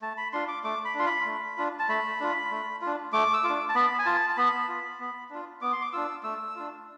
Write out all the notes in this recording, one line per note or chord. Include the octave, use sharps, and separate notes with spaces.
A3 A5
B5
D4 F4 C6
D6
A3 D6
B5
D4 F4 C6
B5
A3
D4 F4
A5
A3 B5
D4 F4
A3
D4 F4
A3 D6
E6
F4 D6
D4
A5
B3 B5
G#5
F4 A5
A5
B3 B5
F4
B3
D4 F4
B3 D6
C6
D6
D4 F4 E6
A3 E6
D4 F4